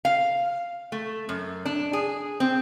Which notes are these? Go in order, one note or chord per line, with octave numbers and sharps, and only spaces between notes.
F5
A3
F#2
D4
G#4
C4